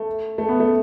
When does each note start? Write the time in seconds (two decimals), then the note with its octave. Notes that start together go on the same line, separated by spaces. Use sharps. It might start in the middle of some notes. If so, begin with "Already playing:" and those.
Already playing: A3
0.38 A3
0.49 B3
0.60 A3